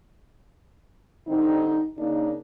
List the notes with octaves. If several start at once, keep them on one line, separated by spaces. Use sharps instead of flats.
D3 G3 C4 D#4
C#3 A#3 D4 D#4